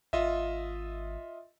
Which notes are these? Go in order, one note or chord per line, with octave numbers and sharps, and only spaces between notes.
G#1 F4 D#5 E5